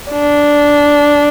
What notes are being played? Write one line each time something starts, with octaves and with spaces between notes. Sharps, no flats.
D4